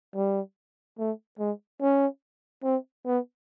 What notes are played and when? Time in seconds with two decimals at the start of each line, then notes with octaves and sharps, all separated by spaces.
0.15 G3
0.98 A3
1.39 G#3
1.81 C#4
2.63 C4
3.06 B3